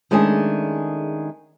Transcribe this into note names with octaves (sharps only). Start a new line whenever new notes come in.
D#3 G#3 A3 C#4 D4 G#4